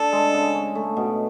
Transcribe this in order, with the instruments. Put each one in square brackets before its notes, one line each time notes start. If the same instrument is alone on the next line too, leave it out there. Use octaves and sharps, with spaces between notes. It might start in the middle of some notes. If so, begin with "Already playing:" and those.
Already playing: [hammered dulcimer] D4 [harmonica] A4
[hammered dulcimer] G#3
C#3
C#4
A3
B2